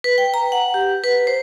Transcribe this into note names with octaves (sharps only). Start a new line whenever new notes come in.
B4
G5
A#5
F#5
G4
B4
C5